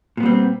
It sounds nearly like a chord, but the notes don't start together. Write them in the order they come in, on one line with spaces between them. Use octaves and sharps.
A#2 B3 G3 C4